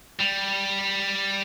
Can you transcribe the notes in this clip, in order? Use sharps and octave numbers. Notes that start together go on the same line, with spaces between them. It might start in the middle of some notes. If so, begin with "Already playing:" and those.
G3